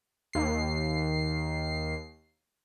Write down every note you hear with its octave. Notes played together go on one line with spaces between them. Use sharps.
D#2 C7